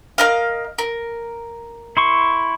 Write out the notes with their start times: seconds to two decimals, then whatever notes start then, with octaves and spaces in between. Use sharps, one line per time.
0.18 A#4 D#5 F5
0.78 A#4
1.97 E4 C6 C#6